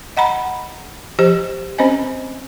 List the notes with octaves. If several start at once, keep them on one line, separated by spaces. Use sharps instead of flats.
D#5 F#5 A#5 B5
F3 G4 C5
C4 C#4 C5 D#5 G#5